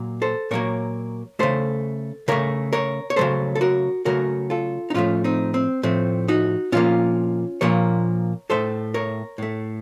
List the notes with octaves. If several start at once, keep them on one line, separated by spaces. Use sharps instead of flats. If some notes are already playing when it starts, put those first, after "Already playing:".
Already playing: A#2 F#3 A#3
A4 C5
A#2 F#3 A#3 A#4 C#5
C#3 A3 A4 C5
C#3 A3 A#4 C#5
A#4 C#5
C#5
C#3 F#3 A3 A4 C5
A4
F#4 A#4
C#3 F#3 A3 F#4 A#4
F4 A4
D#4
A2 F3 A3 C#4 F4
C4 D#4
C4
A2 F3 A3 C4
D#4 F#4
A#2 F3 A#3 C#4 F4
A#2 F3 A#3 A#4 C#5
A2 A3 A4 C5
A#4 C#5
A2 A3